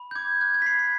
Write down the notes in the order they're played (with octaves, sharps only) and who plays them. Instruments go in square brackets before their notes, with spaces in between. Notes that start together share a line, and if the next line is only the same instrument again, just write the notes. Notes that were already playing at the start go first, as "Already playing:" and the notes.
Already playing: [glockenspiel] B5
G6
D6 G#6
F#6 G#6
G#6
B6
B5 C7
C7